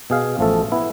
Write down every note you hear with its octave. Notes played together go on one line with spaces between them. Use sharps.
B2 G#4 F5
A1 F3 A3 A4
B3 E4